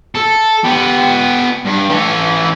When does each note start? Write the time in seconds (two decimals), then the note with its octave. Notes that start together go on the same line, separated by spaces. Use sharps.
0.15 A4
0.64 B3 G4
1.65 G2
1.90 E3 C#4